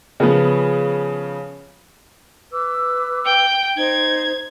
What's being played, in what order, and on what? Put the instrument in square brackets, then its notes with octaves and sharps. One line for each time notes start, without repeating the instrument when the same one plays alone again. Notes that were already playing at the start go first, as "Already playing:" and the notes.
[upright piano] C#3 F3 B3
[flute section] B4 D6 E6
[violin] G5
[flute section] D#4 C5 [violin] G#6